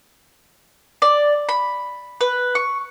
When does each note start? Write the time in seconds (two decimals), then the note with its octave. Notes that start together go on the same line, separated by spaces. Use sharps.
1.02 D5
1.49 B5
2.21 B4
2.55 C#6